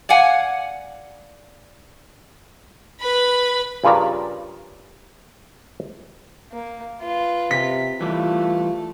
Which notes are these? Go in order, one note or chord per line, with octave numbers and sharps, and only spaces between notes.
D5 F5 F#5 G#5
B4 B5
G2 C#3 F4 A#4 D5 A#5
A#3
F4 B4
C3 B6
E3 G3 A3 F4